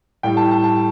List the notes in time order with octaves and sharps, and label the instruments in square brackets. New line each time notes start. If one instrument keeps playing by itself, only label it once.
[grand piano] A2 G3 G5
A5
A5
A5